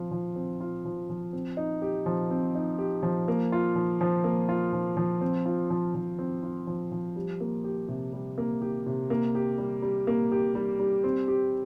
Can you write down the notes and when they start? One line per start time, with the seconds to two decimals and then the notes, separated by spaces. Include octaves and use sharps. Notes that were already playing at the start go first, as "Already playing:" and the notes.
Already playing: F3 C4 F4
0.11 F3
0.36 C4
0.61 F4
0.85 F3
1.10 F3
1.33 C4
1.57 D#4
1.82 G4
2.06 F3
2.30 C4
2.55 D#4
2.78 G4
3.03 F3
3.28 A#3
3.52 F4
3.75 F3
4.01 F3
4.24 A#3
4.49 F4
4.73 F3
4.97 F3
5.21 C4
5.46 F4
5.70 F3
5.95 F3
6.18 C4
6.43 F4
6.67 F3
6.92 F3
7.16 G3
7.40 A#3
7.64 G4
7.88 C3
8.13 G3
8.38 A#3
8.61 G4
8.86 C3
9.10 A#3
9.35 G4
9.58 G3
9.82 G3
10.07 A#3
10.32 G4
10.55 G3
10.80 G3
11.04 C4
11.28 G4